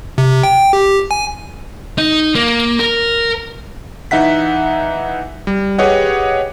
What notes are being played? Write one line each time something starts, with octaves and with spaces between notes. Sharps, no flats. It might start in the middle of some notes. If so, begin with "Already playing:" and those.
C3
G5
G4
G#5
D#4
A#3
A#4
E3 D#4 E5 F#5 B6
G3
G4 G#4 B4 C#5 D#5 F#5